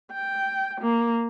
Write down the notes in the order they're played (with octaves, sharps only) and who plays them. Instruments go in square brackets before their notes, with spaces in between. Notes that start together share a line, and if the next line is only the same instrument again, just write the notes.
[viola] G5
A#3